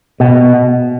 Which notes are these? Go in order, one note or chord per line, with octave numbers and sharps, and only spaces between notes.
B2